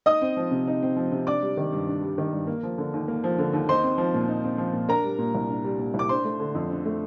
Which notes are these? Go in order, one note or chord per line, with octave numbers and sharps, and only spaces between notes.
D#4 D#5 D#6
C4
F3
C3
D#4
C4
F3
C3
D4 D5 D6
G3
D#3
G2
D4
G3
D#3
G2
A#3
F3
D3
D#2
A#3
F3
D3
D#2
D#4 C5 C6
C4
F3
A#2
D#4
C4
F3
A#2
D4 A#4 A#5
G3
A#2
C2
D4
G3
A#2
C2
D6
D4 C5 C6
A3
D3
F2
D4
A3